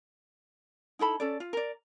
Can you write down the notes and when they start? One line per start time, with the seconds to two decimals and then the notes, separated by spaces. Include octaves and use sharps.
0.99 D#4 E4 A4 B5
1.20 C#4 A4 D5
1.40 F4
1.53 A#4 D5